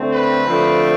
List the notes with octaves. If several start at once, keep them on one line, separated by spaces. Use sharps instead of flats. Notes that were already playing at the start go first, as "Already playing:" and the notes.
Already playing: D3 A3 C4
B4
D3 F3 A3 C4